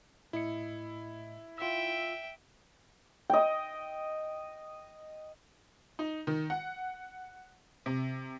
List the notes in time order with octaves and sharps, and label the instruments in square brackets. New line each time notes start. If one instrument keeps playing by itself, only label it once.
[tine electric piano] A2 D#5 C#7 [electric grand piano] E4
[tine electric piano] F4 E6 [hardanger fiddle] E5 G5
[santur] D#5 G5
[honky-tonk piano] D#4
D#3
F#5
C3